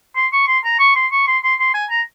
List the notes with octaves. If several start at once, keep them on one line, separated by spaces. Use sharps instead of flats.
C6
C#6
C6
A#5
C#6
C6
C#6
C6
C6
C6
G#5
A#5